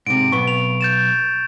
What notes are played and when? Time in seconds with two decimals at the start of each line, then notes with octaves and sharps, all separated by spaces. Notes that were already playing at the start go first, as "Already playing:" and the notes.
0.07 G#2 C3 D7
0.32 B1 B3 C#6
0.48 F7
0.81 G6 A6 E7